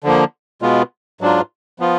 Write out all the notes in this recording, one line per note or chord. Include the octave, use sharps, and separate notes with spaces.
D3 F3 A#3
B2 G#3 B3 F4
G#2 F#3 D4 F4
F3 B3 F4